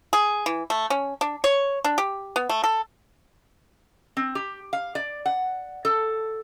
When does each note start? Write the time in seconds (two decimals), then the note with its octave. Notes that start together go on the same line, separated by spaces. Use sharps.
0.13 G#4
0.46 E3
0.70 A3
0.90 C#4
1.21 D4
1.44 C#5
1.84 D4
1.98 G4
2.36 B3
2.49 A3
2.64 A4
4.17 C4
4.35 G4
4.73 F5
4.95 D5
5.26 F#5
5.85 A4